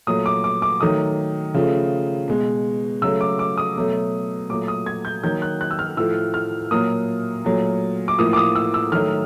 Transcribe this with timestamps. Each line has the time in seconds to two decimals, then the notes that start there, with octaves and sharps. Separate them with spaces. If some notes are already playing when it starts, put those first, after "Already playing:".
0.07 A#2 F#3 A3 D#6
0.26 D6
0.44 D6
0.62 D6
0.81 D#3 F#3 A3 D#6
1.54 C#3 F3 A3
2.28 B2 G#3
3.02 C#3 F#3 A3 E6
3.21 D6
3.39 D6
3.58 D#6
3.76 B2 F#3 A3
4.50 A#2 F#3 A3 D6
4.68 D#6
4.86 G#6
5.05 G6
5.23 D#3 F#3 A#3 G6
5.42 F#6
5.61 F#6
5.71 E6
5.79 F6
5.97 A2 F3 A3 E6
6.34 F6
6.71 A#2 F#3 A#3 D#6
7.45 A#2 F#3 A3
8.08 D6
8.18 A2 F3 A#3 D#6
8.33 D6
8.37 D#6
8.55 E6
8.74 E6
8.92 D#3 F#3 A3 F6